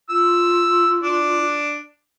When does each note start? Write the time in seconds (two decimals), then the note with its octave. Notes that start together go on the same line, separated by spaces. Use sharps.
0.10 F4 E6
1.03 D4